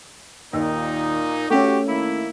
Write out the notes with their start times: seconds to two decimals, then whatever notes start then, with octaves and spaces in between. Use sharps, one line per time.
0.53 D#2 A#2 D#4
1.50 A3 C#4 F#4 G4
1.88 D#3 A#3 E4